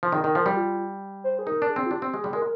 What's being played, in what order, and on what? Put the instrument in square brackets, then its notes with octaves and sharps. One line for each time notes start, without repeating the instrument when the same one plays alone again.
[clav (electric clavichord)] F3
[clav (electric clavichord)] D#3 [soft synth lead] G#4
[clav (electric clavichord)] D#3 [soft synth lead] A#4
[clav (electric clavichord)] F3 [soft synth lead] A#4
[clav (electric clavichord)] G3 [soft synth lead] G4
[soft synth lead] F4
C5
G#4
[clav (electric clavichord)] D#4 [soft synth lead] A#4
[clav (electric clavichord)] D4
[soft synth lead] G#4
[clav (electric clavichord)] C4
[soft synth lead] F4
[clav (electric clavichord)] D4 [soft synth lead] G4
[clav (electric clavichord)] C4
[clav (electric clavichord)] G#3 [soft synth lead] G#4
[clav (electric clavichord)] G3
[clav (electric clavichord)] G#3 [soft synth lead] A#4